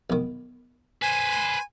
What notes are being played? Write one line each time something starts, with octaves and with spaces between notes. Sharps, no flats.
B1 D#3
B4 C5 G#5